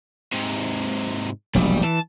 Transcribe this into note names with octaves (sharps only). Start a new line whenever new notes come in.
G#2 C3
E1 A#1 F#3 G3
E3 A5